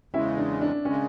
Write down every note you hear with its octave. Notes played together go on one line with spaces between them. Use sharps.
E2 C#3 G#3 C#4 E4
D4
D4
C#3 G#3 C#4